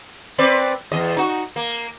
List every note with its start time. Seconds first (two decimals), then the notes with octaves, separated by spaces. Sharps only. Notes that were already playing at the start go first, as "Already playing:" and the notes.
0.38 C4 B4 D5
0.92 E2 D#5
1.17 D#4 F#4
1.56 A#3